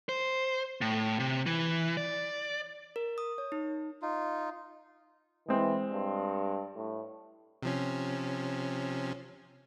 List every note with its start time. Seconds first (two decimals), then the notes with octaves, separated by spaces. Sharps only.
0.09 C5
0.81 A2
1.19 C3
1.46 E3
1.97 D5
2.96 A#4
3.18 D#6
3.38 C#5
3.52 D#4
4.02 D#4 F4
5.48 E3 G#3 C4
5.92 G2
6.76 A2
7.63 C3 F3 C#4